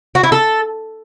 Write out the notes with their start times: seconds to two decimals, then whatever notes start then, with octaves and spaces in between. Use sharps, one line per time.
0.15 F#4
0.24 E4
0.32 A4